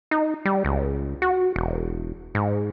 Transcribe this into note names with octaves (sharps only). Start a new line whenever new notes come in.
D#4
G3
C#2
F#4
E1
G#2